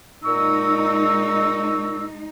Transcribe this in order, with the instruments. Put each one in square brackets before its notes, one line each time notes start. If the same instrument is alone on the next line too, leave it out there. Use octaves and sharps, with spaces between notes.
[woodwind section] A#2 C#6 E6 [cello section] G#3 D#4